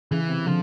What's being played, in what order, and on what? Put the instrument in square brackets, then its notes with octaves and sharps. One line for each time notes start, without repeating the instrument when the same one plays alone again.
[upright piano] C#3 [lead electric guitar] E3
[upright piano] C3
[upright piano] D3 [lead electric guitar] F3